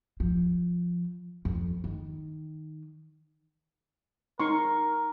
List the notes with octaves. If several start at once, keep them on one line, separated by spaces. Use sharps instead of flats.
F3
F2
D#3
D#4 A#4 C6 C#6